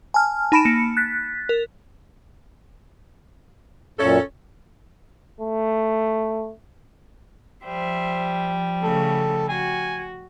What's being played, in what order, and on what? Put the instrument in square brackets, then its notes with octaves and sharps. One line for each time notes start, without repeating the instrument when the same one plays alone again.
[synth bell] G#5 A5 F6
D#4 A5 B5 A#6 D7 E7
A#3 C#7
F#6 A6 B6
A#4
[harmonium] F#2 A#2 [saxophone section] C#4 A4
[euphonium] A3
[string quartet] F3 G3 [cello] C5 E5
[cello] C#3 A3 [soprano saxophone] A4
[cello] F#4 [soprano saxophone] G#5